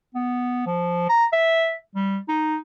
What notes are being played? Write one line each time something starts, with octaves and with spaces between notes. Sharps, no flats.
B3
F3
A#5
E5
G3
D#4